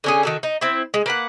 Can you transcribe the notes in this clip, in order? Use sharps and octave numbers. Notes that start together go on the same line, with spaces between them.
D3 C#4 G#4
D#3 F#4 A4
D#4
C4 E4
G#3
A#3 B4 F#5